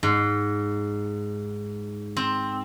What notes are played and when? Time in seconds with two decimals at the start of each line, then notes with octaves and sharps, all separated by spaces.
0.03 G#2
2.17 C4